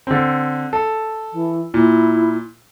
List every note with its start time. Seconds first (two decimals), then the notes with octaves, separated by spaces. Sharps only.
0.07 D3 C4
0.73 A4
1.32 E3
1.74 A#2 E4